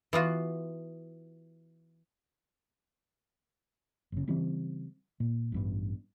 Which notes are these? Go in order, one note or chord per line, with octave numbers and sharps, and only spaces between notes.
E3 B3 F4 F#4
F#1 C#3
C#3 E3 G3 C4
A#2
A1 G2 B3